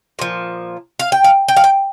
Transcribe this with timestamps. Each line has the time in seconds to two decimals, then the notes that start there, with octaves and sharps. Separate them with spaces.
0.19 A#2 F3
0.99 F5
1.12 G5
1.24 F5
1.48 G5
1.57 F5
1.64 G5